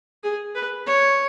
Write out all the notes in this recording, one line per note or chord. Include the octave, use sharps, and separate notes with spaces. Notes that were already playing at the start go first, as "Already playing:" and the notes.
G#4
B4
C#5